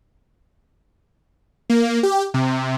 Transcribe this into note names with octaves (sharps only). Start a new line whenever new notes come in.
A#3
G4
C3